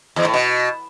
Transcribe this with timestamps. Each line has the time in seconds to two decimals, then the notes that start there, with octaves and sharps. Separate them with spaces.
0.16 E2
0.25 A2
0.34 B2